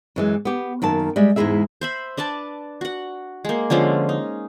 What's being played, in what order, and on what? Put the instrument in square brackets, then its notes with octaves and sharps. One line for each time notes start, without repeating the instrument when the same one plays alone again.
[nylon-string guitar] F#2 E3 G#3
B3 G4
F#2 D#3 A#3 A5
G3 G#3 G4 E5
E2 G#2 G#3 E4 G#4 E5
[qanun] C5 E5 B5
D4 B4 D5 A5
F#4 F#5
G#3 A#3
D3 F3 G#3 C#4
D#4